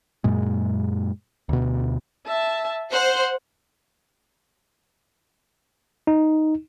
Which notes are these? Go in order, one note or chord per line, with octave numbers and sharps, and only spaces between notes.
F#2 A#2 G#3
D2 B2
E5 A5
C5 F#5
D#4